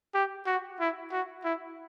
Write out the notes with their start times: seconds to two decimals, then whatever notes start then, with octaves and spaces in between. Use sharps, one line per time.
0.14 G4
0.47 F#4
0.80 E4
1.12 F#4
1.44 E4